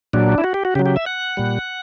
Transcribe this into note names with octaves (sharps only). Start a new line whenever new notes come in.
A#2 F#3 D4
E4
F#4
G4
F#4
C#3 F#3 G4
G4
E5
F#5
A#2 G3